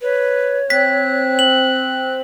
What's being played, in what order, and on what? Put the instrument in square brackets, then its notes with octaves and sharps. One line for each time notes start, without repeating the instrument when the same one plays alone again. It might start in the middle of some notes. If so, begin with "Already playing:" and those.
[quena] B4 [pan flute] C#5
[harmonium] C4 [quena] F#6 [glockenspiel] B6
[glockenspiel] F#7